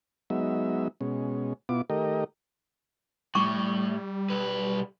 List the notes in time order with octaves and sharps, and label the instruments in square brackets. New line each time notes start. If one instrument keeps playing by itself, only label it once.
[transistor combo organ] F#3 G#3 B3 D#4 E5
B2 G#3 C#4
B2 B3 E4 F4 D6
D#3 A3 G4 A#4 D#5
[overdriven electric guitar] A2 [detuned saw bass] G3 [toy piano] C#6 D6
[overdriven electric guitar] B1 B4